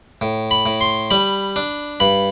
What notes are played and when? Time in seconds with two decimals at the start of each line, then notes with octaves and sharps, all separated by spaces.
0.21 A2
0.51 B5
0.66 A2
0.81 C6
1.10 G3 B5
1.56 D4
2.00 G2 B5